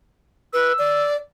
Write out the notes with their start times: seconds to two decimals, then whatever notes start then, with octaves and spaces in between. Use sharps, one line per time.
0.54 B4 E6
0.79 D5